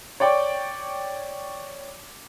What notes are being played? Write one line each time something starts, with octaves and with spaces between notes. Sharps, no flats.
C#5 D5 G5 C#6